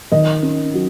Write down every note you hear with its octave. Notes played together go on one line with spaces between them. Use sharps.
D#3 D#5
C#4
F#3